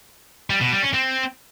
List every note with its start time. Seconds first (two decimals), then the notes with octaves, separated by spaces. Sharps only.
0.50 G3
0.61 B2
0.72 G3
0.82 C#4
0.93 C4